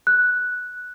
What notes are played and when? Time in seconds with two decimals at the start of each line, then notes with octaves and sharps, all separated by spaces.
0.07 F#6